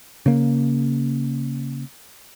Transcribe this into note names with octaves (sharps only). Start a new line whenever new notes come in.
C#3 A#3